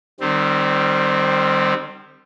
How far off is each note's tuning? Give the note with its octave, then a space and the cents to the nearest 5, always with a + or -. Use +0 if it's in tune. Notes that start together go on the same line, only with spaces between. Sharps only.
D#3 -40 G3 +0 C4 +0